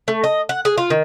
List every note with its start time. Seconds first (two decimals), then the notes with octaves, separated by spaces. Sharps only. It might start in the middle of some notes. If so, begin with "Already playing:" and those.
0.08 A3
0.24 D#5
0.49 F#5
0.65 G#4
0.78 F4
0.90 D#3